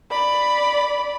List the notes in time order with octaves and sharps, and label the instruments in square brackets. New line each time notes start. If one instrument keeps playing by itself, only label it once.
[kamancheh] D5 B5